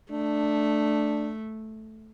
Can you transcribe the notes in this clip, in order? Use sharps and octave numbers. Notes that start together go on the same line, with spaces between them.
A3 D4